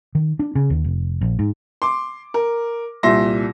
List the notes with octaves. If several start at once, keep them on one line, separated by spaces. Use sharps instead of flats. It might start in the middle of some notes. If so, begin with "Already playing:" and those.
D#3
D4
C#3
D#2
F1
A#1
G#2
C6 D6
A#4
C2 A#2 E5 C6 A#6